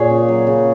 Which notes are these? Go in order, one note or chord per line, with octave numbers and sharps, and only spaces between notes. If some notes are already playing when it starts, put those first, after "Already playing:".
Already playing: A#2 G#4 C#5
C#3
F#3
C#3